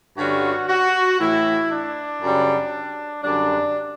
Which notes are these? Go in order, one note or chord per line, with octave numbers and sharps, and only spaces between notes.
G2 D3 G3 C#4 F#4
F#4
A2 E3 A3 E4
D4
F#2 C#3 G3
F#2 D3 G3 D4